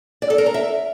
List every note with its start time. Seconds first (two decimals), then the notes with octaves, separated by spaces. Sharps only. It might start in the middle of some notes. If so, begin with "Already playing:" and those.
0.22 D5
0.30 A4
0.38 A#4
0.46 A#5
0.54 E5